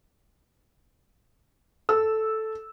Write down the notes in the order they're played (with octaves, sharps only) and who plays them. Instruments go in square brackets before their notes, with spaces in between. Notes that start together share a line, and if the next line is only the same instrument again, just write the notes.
[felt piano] A4 E6